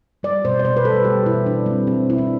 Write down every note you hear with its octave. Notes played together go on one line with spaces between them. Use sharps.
G3 D5
B2 C5
D5
B2 C5
B4
G3 A4
G3 G4
B2 E4
B2 D4
G3 C4
G3 C4
B2 E4
D4